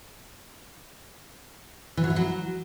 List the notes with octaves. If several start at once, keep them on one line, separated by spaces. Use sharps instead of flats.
E3
F#3
E4
F#3